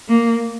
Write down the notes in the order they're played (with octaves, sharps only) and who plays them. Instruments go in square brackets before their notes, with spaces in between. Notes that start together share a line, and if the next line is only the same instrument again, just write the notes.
[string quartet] A#3